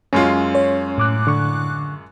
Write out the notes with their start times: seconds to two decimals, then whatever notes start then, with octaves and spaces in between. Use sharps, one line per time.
0.13 F#2 G#3 C#4 F4
0.55 C#5
0.98 A2 D6 F#6
1.27 D3 C#6